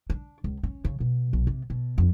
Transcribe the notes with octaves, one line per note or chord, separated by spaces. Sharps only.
D4
C#2
C#4
C#3
B2
B1
C3
B2
F2